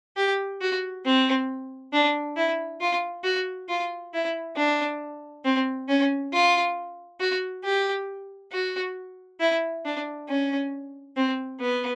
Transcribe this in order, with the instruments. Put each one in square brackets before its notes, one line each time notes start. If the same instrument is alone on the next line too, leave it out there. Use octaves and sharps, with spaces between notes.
[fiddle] G4
F#4
C4
D4
E4
F4
F#4
F4
E4
D4
C4
C#4
F4
F#4
G4
F#4
E4
D4
C#4
C4
B3